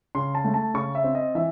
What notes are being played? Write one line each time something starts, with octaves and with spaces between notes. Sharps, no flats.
C#3 C6
A5
A3
A5
C#3 C#6
E5
C4
D#5
E3 E5